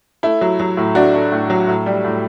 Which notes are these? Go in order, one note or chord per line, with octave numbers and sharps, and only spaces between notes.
A3 E4
F#3
F#3
A2
A3 D4 F#4
A3
A2
F#3
A2
G3
A2